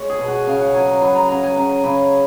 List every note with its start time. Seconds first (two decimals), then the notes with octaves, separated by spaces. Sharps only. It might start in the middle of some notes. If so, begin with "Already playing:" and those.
Already playing: G#3 C#5
0.10 G#4
0.19 B2
0.28 F#4
0.47 C#3 F5
0.61 F#5
0.74 F#3 G#5
0.88 A#5
1.02 F#3 B5
1.16 A#5
1.29 C#3 A#5
1.43 G#5
1.57 C#3 A#5
1.84 C#3 B5